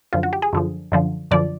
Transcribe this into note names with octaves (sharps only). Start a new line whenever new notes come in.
F#2 D3 F3 F4
F#4
G4
G#4
F#2 D3 F3
F#2 D3 F3
F#2 D3 F3 D5